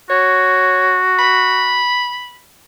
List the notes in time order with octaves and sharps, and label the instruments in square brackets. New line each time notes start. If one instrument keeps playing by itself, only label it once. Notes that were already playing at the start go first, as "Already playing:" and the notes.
[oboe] F#4 [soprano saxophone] C#5
[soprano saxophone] B5